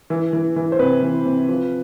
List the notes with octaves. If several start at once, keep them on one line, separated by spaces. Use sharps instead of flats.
E3
E3
E3
C5
C3 B4
E3
C3
F3